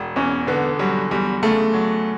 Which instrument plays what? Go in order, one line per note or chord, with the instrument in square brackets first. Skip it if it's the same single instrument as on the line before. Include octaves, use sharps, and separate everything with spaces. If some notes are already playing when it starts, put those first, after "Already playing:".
Already playing: [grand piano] E1
[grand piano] E2 [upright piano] C#4
[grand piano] D3 [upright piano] B3
[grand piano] F#3 [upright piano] G3
[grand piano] E2 [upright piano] G3
[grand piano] C#3 [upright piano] A3
[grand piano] F#3